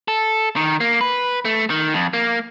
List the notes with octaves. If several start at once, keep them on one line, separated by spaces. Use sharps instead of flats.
A4
D#3
A#3
B4
A3
D#3
F2
A#3